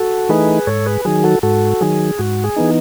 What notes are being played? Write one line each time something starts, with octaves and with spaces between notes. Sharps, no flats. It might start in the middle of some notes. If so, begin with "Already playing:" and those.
Already playing: F#4 A4
E3 A3 D#4 G#4 B4
G#2 A4 C#5
G#4 B4
D#3 F#3 G#4
F#4 A4
G#2 F#4 A4
D#3 F#3 G#4
G#2 F#4
G#4
E3 B3 D#4